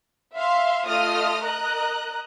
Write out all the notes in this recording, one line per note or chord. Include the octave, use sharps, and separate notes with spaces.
E5 F5 C6
A3 F4 D#5 D#6 F6
A#4 D#5 A#5 F#6